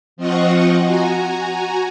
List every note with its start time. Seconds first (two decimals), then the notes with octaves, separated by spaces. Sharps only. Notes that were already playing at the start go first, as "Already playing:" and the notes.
0.17 F3 C4 F4 D#5 F#5 C#6
0.82 F#4 G#5 A#5